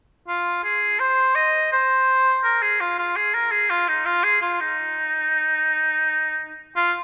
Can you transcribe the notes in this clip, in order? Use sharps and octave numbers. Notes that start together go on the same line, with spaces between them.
F4
G#4
C5
D#5
C5
A#4
G#4
F4
F4
G#4
A#4
G#4
F4
D#4
F4
G#4
F4
D#4
F4